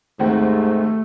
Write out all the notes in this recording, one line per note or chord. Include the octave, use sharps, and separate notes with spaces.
D#2 G#2 A3 C4 F#5